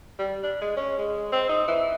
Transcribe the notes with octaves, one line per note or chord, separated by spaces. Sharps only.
G3
D4
G#3
C#4
G#3
C4
D#4
E3